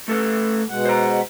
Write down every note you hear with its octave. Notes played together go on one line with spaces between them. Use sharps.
A3 A4 B4
B2 G#3 F#5
C5 A#5